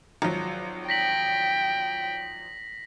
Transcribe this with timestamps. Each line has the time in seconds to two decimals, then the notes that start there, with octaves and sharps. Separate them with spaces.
0.22 G#1 F3 F#3
0.89 G5 A#6 B6 F#7